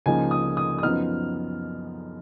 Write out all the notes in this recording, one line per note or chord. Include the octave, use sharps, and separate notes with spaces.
C#2 C#3 F3 A#3 D#4 G#5
D#6
D#6
D#6
F#2 F3 B3 D#4 F6